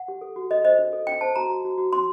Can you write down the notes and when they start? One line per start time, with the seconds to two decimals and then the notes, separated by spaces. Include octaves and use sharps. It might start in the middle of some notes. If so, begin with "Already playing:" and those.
Already playing: F#5
0.08 G4
0.21 A4
0.36 F#4
0.51 A4 D#5
0.65 C5 D#5
0.79 D4
0.93 A4
1.07 D4 G5
1.21 C5 A5
1.36 F#4 A#5
1.49 F#4
1.65 F#4
1.78 F#4
1.93 F#4 C6